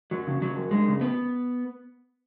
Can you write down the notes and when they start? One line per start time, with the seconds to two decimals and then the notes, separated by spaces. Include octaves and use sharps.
0.11 F#2 F#3
0.27 C#3
0.41 C#3 F#3
0.56 F#2
0.71 F#2 G#3
0.86 C#3
1.01 B3